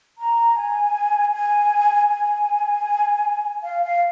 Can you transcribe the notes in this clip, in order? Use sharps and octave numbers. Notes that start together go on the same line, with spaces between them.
A#5
G#5
G#5
G#5
F5
F5